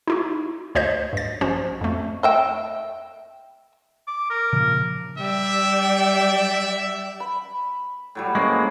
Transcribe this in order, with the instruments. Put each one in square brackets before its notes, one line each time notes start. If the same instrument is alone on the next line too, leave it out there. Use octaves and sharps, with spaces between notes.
[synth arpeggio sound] D#4 E4 F#4
D2 C5 C#5 D#5 G6
G2 A6
A#1 C#4 F#4 C5
F2 A3
[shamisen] D#5 E5 G5
[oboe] D6
A#4
[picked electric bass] A#2 C#3 F3
[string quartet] G3 D5 G5 [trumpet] E5
[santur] B5
[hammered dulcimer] A2 F#3 G3
[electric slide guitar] G#3 A#3 [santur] C#4 C5